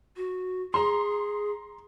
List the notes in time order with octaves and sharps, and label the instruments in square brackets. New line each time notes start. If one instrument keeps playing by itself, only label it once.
[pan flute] F#4
[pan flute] G#4 [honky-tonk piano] A#5 C6